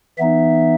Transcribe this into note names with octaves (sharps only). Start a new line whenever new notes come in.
E3 B3 D#4 E5